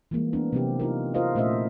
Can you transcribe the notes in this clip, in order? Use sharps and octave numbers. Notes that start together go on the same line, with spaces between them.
E3 G3 G#3 A#3
B3 C4 D4 A#4
C3 F#3 C4 E4 G4
D#4 F4 A#4
E4 F4 A#4 C5 D#5 F5
A#2 A3 C#4 C5 D#5 E5